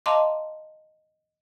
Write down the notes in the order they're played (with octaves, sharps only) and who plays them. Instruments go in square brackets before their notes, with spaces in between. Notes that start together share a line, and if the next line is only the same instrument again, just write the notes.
[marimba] D#5 F5 A5 A#5 C6 D6